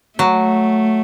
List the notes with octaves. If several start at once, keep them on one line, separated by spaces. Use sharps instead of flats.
F#3 A3